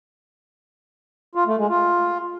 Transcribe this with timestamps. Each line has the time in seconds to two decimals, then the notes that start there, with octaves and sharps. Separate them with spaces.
1.35 F4
1.47 A3
1.58 G#3
1.69 F4